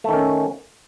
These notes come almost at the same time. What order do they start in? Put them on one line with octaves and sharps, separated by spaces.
A3 D#3 C#4